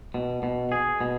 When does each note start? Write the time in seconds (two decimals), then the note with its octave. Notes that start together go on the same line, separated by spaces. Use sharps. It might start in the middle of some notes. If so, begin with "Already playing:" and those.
0.14 B2
0.43 B2
0.72 G#4
1.01 B2